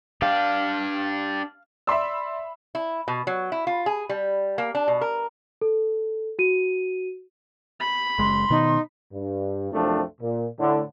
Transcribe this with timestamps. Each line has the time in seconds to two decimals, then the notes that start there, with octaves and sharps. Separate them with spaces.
0.22 D4 G4 F5
1.87 D5 E5 B5 C6 E6
2.75 E4
3.08 B2
3.27 F#3
3.52 E4
3.67 F4
3.86 G#4
4.09 G3
4.58 A#3
4.75 D4
4.88 B2
5.01 A#4
5.61 A4
6.39 F#4 D#7
7.80 B5
8.19 F#1 G#3 C6
8.50 B2 D#3 B3 D#4
9.13 G2
9.71 C2 F#2 F3 A3 C4 D4
10.21 A#2
10.59 A2 D3